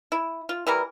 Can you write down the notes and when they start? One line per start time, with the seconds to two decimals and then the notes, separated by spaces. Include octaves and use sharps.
0.12 E4
0.49 F4
0.67 E3 G3 A#4